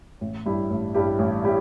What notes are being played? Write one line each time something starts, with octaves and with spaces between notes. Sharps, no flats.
A1
G2 G3 E4 G4
A1
G2 G3 E4 G4
A1
G3 E4 G4